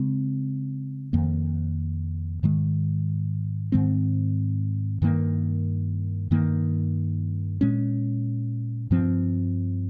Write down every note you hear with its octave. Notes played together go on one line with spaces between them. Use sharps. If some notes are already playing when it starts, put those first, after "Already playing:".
Already playing: C#3 G#3 C4
F2 D#3 A#3
G#2 D#3 G#3
G#2 D#3 G#3 C4
G2 D#3 A#3
G2 D#3 A#3
A#2 G#3 C#4
G2 F3 C4